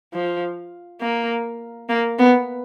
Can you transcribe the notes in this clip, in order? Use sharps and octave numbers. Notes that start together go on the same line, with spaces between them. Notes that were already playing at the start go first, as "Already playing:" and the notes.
F3
A#3
A#3
B3